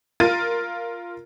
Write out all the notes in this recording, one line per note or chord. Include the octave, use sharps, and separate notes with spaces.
F4 A#4 A6 D#7